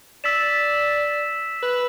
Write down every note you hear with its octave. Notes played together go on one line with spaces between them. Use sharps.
D5 E6 B6 E7
B4